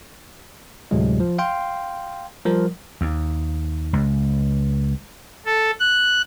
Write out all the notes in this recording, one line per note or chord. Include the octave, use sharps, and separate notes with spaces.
D2 A2 C3 F#3 G#3
F3
F5 G5 C6
F3 G3 A#4
D#2
C#2
A4
F#6